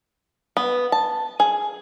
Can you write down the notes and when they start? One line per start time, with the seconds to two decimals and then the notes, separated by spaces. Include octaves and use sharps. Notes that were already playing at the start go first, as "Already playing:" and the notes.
0.57 B3
0.92 A5
1.40 G#4